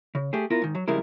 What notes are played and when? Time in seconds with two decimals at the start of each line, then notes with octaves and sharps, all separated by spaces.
0.15 C#3
0.33 A3 G4 G#4
0.50 B3 E4 F4 A#4
0.62 G#2 D#3
0.75 F#3
0.88 F2 C#3 G3 G#3 E4 A#4